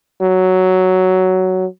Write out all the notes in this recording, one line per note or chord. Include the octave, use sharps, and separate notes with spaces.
F#3